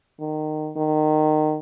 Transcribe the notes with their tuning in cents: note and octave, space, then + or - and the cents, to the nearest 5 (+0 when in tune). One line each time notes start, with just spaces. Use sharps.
D#3 -20
D#3 -20